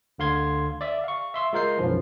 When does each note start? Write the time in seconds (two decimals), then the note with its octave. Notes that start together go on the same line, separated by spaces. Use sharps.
0.18 D2 D3 F5 C6 G#6
0.81 D5 E5
1.04 F5 C#6
1.34 E5 C6 E6
1.53 G#3 F4 A#4 G6 C7
1.78 B1 F#2 E3 F3